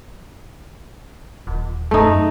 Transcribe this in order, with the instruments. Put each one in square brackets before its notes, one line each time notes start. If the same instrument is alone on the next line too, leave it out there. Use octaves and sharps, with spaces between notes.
[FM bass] D#1
[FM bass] F#2 [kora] A3 D#4